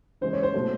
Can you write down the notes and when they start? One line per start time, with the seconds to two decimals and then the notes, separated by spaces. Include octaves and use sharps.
0.21 C#3 E3 G#3 C5
0.33 C#5
0.43 C5
0.54 B2 F#3 A3